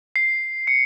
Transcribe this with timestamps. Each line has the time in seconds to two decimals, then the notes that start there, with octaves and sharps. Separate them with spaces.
0.16 C7
0.67 C#7